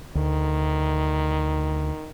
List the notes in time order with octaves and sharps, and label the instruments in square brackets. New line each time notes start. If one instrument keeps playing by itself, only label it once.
[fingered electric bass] D2 [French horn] D#3